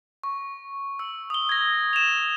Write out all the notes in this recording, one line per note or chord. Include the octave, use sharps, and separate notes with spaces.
C#6
E6
D#6 G7
G#6 A#6
E7 F7